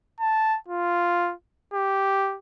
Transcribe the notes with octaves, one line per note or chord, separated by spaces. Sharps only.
A5
F4
G4